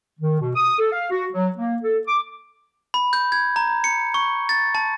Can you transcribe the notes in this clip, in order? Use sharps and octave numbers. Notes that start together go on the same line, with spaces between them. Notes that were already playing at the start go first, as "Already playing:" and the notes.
D#3
B2
D#6
A4
F5
F#4
F#3
A#3
A4
D6
B5
G6
G#6
A#5
C#7
C#6
A6
A5